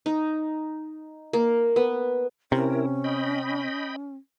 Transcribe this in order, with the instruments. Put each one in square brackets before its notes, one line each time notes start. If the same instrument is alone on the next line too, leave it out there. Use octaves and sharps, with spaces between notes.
[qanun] D#4
A#3
B3
[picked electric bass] C3 [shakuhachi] C#4 [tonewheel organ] E4 A#4
[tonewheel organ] D#5 G5 B5